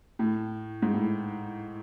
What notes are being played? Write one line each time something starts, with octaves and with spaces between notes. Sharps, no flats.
A2
G#2
A2